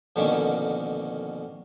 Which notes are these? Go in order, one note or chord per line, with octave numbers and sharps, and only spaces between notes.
F2 B2 D3 D#3 A#3 C#4